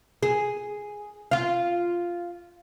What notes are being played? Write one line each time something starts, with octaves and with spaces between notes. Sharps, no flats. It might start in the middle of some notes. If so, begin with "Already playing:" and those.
G#4
F4 F5